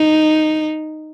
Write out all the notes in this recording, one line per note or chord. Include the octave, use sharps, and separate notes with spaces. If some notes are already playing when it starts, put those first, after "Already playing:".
Already playing: D#4